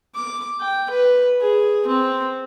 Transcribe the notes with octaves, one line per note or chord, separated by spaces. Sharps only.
D6
G5
B4
G#4
C4